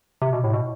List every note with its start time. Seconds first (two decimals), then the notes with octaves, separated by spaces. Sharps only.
0.22 C3
0.33 B2
0.44 A2
0.53 B2